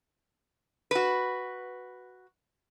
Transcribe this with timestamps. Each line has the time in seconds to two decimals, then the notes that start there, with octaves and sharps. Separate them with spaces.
0.91 F#4 B4